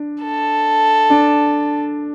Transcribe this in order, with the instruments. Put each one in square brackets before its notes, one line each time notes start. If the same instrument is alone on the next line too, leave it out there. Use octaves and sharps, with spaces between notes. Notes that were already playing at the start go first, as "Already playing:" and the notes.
Already playing: [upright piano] D4
[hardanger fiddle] A4
[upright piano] D4